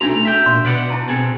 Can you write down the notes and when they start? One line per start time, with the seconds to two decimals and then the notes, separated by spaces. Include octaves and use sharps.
0.01 C2 B2 A3 D4 D#4 F#4 A#5
0.25 E5 G5
0.46 A#2 C6
0.65 B2 B4 D5 F#5
0.90 E4 A5 A#5
1.08 C4 G#4 A4